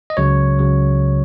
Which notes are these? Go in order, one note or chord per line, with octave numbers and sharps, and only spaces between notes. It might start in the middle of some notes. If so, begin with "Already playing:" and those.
D#5
C#2 C#3 F#3 C#5
C#2 C#3 F#3